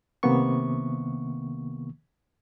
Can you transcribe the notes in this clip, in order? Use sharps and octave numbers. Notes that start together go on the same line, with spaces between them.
C2 C3 D#3 A#3 B3 C#6